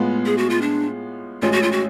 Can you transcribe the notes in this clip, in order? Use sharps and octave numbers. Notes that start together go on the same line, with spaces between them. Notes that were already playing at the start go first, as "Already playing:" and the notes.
Already playing: A2 G#3 B3 F4
G#4
F#4
F4
D4
A1 A2 G#3 C#4 F4
F#4
F4
F#4